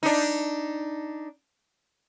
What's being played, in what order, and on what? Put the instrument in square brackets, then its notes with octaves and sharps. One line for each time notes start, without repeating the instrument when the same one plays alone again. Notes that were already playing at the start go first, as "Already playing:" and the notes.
[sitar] D4 D#4